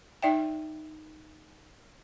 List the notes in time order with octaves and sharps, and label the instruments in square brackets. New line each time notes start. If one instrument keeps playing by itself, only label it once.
[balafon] D#4 D5 E5 G5